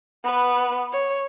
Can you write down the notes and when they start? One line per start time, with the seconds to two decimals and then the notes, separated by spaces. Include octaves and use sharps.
0.24 B3 B4
0.93 C#5